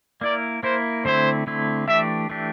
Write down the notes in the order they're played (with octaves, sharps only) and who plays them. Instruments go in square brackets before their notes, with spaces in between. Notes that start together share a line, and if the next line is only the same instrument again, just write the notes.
[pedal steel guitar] A#3 E4 A#4 [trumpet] D5
[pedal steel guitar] A#3 E4 A#4 [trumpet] C5
[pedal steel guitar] D3 A3 C4 E4 [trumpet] C5
[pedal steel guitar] D3 A3 C4 E4
[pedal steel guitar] E3 A3 D4 G4 [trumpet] E5
[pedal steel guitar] E3 A3 D4 G4